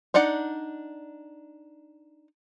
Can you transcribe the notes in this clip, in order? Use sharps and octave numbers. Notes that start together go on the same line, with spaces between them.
D4 D#4 D5 F#5